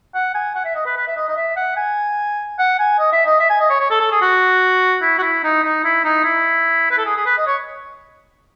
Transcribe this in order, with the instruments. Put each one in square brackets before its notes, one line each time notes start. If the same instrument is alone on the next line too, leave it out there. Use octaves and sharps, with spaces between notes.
[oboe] F#5
G#5
F#5
E5
D#5
B4
B4
E5
D#5
D#5
E5
F#5
G#5
F#5
G#5
D#5
E5
D#5
E5
G#5
D#5
C#5
C#5
A4
A4
G#4
F#4
E4
F#4
E4
D#4
D#4
E4
D#4
E4
B4
A4
G#4
G#4
B4
D#5
C#5